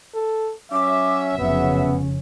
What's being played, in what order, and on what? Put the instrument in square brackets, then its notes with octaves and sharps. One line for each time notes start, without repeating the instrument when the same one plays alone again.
[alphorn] A4
[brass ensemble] F#3 E5 [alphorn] C#4 [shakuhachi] D6
[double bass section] F1 C#3 C#4 [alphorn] B3 [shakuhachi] F#5